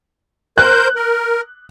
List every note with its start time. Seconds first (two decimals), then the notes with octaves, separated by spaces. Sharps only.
0.58 A#4 C5 F#6 G6
0.96 A#4